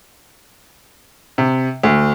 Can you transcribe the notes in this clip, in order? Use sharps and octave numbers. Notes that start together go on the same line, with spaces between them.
C3
D2